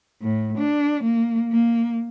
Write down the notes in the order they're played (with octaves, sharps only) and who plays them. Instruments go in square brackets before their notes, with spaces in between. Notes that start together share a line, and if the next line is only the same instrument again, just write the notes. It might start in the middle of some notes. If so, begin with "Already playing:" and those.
[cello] A2
D4
A#3
A#3